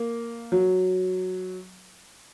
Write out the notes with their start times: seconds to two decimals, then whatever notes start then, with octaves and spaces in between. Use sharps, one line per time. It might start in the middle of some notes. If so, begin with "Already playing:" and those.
Already playing: A#3
0.52 F#3